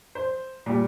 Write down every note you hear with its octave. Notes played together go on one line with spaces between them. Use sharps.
C5
A#2 G3